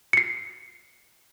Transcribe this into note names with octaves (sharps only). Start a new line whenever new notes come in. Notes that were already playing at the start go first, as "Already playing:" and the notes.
C7 C#7